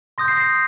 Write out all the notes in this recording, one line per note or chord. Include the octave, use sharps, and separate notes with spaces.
C6 D#6 G6 A#6
C7
A#6